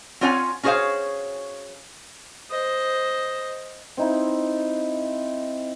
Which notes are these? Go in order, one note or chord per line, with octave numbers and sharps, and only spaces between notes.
C4 C#4 F4 C#5 F#5 G#5
C#4 F#4 G#4 C5 C#5 F5
C5 D#5
C4 D#4 E4